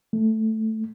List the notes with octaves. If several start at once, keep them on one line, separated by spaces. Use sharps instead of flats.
A3